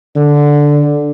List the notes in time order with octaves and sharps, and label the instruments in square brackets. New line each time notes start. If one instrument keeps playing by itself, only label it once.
[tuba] D3